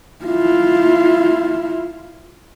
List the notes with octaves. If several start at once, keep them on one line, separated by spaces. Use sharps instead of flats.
E4 F4